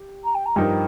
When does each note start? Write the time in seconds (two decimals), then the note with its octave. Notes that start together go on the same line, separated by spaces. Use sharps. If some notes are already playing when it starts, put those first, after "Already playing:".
Already playing: G4
0.24 A#5
0.34 G5
0.45 A#5
0.56 G2 F3 D#4 A#4 G5